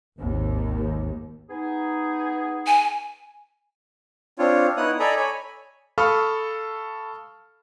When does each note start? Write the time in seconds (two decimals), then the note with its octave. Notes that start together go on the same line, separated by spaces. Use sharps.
0.18 G#1 D#2
1.50 B3 D#4 G#4
2.67 G#5
4.39 C4 D4 F4 C#5
4.77 B3 D#4 E4 C#5 D#6 F#6
4.99 A4 D5 D#5 G#5 A#5 B5
5.17 C#5 G#5 B5
5.98 A4 F5 B5 C#6 D#6 F6